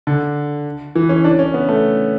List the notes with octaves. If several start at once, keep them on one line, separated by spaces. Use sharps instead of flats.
D3
E3
C#4
D4
C#4
B3
A3